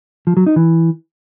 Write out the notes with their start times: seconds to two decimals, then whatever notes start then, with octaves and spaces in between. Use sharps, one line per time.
0.27 F3
0.37 F#3
0.46 D#4
0.56 E3